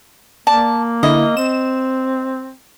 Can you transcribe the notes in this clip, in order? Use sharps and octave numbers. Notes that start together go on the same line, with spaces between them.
A#3 D5 A5
D3 E4 D#5
C4 E7